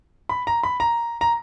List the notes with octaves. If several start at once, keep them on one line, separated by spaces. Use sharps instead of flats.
B5
A#5
B5
A#5
A#5